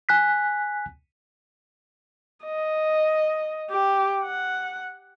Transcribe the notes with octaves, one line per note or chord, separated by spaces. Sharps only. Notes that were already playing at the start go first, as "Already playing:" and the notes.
G#5 F#6 B6
D#5
G4
F#5